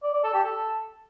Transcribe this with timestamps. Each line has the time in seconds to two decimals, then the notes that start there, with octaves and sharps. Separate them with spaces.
0.03 D5
0.13 D5
0.24 A4
0.34 G4
0.44 A4